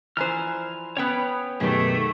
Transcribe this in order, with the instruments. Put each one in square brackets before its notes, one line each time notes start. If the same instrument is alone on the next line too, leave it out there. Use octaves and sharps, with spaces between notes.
[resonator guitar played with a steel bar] E3 F3 C5 [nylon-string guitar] D5 [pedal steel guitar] G#5 A#5 F6
[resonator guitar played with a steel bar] B3 C#4 [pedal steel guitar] C#5 G5 B5
[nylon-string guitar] F#2 B2 D#3 [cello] A3 [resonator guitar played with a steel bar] G4 G#4